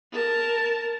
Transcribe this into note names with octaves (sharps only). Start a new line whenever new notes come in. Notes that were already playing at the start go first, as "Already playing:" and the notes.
A#4 A5